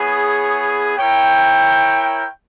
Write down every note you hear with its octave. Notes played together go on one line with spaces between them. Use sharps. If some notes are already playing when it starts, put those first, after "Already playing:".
Already playing: B3 E4 G#4 C#5
E4 A#4 C#5 G5